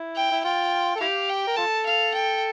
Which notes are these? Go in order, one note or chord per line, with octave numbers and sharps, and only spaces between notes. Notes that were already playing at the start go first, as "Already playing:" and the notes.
Already playing: E4
G5
E4
F4 G5
A4
E4 G4 F5
G5
A#4
F4 A4 A5
F5
G5